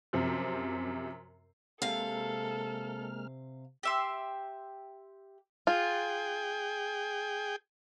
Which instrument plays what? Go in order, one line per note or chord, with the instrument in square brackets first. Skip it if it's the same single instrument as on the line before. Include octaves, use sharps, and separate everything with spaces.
[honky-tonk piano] F#2 C3 F3
[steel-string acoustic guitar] C3 F5 [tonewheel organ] G#3 A#3 F6 [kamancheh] A4
[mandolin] G4 E5 C6
[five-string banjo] F4 [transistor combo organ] G#4 G5